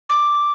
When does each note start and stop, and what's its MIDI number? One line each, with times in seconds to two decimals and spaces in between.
0.09 0.52 86